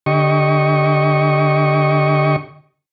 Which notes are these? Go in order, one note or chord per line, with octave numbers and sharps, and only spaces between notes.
D3 G4 D#5 C#6